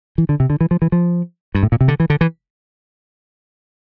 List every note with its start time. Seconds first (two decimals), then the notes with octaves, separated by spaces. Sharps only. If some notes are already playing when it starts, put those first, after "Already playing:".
0.18 E3
0.29 D3
0.40 C3
0.50 D3
0.61 E3
0.71 F3
0.82 E3
0.92 F3
1.55 G2
1.63 A2
1.72 A#2
1.81 C3
1.88 D3
2.00 E3
2.10 D3
2.21 E3